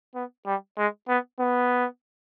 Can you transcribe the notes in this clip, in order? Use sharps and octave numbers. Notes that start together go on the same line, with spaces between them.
B3
G3
G#3
B3
B3